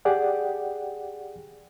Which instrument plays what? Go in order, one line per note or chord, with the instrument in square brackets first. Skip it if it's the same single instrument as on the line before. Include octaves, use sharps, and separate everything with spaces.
[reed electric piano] G4 G#4 D5 F#5 G5